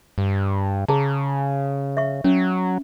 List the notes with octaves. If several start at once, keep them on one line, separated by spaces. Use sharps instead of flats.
G2
C#3 G#4 A5 A#5
E5 C#6
F#3 C#4